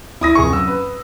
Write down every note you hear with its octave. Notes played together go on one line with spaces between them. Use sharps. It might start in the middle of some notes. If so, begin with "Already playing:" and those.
E4 D#6 A#6
F1 G#4 C#6
F#2 E6
B4